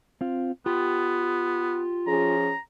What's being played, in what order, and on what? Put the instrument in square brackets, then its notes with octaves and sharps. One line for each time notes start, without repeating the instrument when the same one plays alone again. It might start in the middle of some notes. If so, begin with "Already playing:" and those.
[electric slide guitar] C4 F4
[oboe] B3 [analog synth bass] F4 [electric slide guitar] G4
[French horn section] F3 C#4 G#4 [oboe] A#5